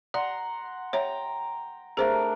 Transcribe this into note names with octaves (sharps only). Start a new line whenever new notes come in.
D5 F#5 A#5 C6
C#5 E5 G5 A#5
A3 D4 G#4 A#4 C5